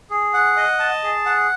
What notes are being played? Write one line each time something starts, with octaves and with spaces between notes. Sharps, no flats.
G#4
F#5
D#5
A5
G#4
F#5